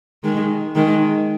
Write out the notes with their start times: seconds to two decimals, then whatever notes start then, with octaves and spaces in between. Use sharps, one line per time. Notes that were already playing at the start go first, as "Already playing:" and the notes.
0.24 D#3 G#3
0.75 D#3 G#3